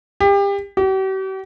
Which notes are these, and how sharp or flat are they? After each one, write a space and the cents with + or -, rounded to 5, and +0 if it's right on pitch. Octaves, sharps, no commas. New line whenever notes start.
G4 +30
G4 -45